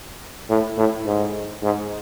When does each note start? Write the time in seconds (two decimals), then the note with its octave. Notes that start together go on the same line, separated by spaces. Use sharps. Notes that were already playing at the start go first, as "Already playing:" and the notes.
0.50 A2
0.77 A2
1.06 G#2
1.63 G#2